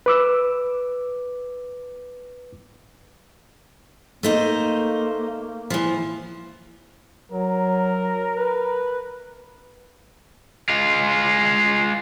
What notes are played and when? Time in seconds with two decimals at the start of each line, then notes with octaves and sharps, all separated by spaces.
0.06 B4 D6 E6
4.23 A3 A#3 D#4 C5
5.70 E3 F3
7.32 F#3 A#4
8.36 B4
10.69 G#3 F4